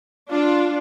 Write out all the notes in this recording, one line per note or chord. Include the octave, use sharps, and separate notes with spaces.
D4 F4